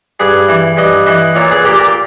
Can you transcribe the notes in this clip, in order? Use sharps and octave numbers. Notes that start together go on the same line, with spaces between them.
G2 G#4 B4
E3
G2 B4 D#5
E3 B4 D#5
A#2 A#4 C#5
G#4 B4
A#2 G4 A#4
G4 A#4